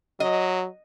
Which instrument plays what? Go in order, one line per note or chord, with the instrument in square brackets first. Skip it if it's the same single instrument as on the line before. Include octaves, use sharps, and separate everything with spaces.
[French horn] F#3 [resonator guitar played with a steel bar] D#5